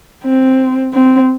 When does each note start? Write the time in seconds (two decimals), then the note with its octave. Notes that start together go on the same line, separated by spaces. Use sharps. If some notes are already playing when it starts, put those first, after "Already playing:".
0.24 C4
0.94 C4